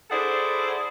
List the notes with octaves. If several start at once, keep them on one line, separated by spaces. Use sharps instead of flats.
E4 G#4 A4 C5 D5 F#5